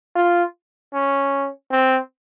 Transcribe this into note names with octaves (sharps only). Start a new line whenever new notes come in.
F4
C#4
C4